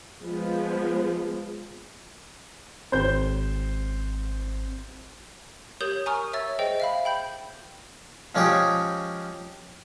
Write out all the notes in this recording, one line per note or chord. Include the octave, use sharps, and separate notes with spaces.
F3 G#3 B3
G#1 C4 C5 G6
G4 A#4 C#5 D#6 G6 F#7
G#5 A#5 C#6 D#6 F6
C#5 E5 C#6 E6 A6
G#4 C5 D#5 G5
E5 F5 B5
G5 B5 G6
F3 G#3 C#4 G4 G#4